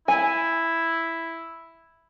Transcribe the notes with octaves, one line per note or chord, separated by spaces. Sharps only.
E4 G#5